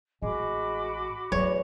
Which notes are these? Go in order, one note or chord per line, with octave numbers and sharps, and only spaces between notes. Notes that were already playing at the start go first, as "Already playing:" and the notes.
A1 G#3 F#4 B5 D6
E2 F#3 A3 C#5